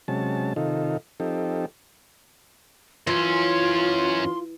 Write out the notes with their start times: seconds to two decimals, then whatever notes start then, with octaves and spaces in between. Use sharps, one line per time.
0.08 C3 F#3 G#3 C#4 A5
0.56 C3 D#3 D#4 F4 A4
1.20 F3 C4 D#4 G4 A4
3.07 F#2 E3 C#4 F4 C6